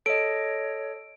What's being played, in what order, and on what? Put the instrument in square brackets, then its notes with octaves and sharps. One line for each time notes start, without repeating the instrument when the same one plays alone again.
[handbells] A4 D#5 [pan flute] C#5 [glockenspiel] D7